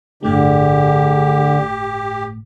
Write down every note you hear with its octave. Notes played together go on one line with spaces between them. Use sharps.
G1 A2 D3 A3 D4 G4 G#4